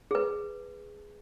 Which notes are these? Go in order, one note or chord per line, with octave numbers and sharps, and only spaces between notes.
G#4 B4